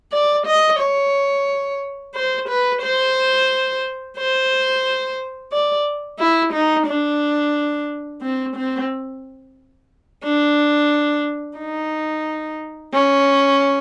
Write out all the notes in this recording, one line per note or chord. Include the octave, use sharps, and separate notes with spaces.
D5
D#5
C#5
C5
B4
C5
C5
D5
E4
D#4
D4
C4
C4
D4
D#4
C#4